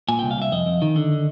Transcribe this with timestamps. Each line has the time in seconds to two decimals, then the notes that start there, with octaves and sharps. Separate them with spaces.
0.09 A#2 G#5
0.19 C2 G5
0.31 F5
0.37 C2 E5
0.52 F2 D#5
0.66 F2
0.82 D#3
0.96 D3